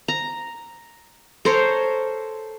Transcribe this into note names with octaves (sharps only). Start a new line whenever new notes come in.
A#5
A4 A#4 C5 C#5